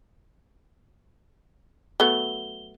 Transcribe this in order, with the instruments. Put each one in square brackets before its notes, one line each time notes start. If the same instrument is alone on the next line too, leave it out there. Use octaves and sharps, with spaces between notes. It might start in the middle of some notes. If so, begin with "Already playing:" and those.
[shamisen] F#3 A3 B3 [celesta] G7